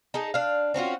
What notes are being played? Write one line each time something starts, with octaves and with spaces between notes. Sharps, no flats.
D#4 G#4 A4
D4 F5
C4 C#4 F4 F#4